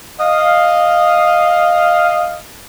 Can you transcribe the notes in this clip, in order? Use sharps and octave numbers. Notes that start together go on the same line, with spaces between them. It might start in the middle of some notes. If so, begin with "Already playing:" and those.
D#5 F5